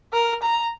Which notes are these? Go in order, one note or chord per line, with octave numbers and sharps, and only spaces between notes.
A#4
A#5